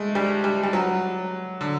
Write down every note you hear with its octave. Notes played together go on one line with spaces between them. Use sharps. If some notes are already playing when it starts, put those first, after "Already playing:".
Already playing: G#3 A3
G3
G3
G3
F#3
D3